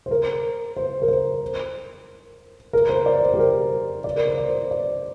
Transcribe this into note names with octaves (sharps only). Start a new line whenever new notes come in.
C5
A#4
C5
A#4
C5
A#4
C5
D5
C5
G4
A#4
D5
A#4
C5
D5
C5
D5